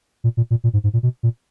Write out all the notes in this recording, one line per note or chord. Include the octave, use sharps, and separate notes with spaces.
A#2
A#2
A#2
A#2
G#2
G#2
A#2
B2
A#2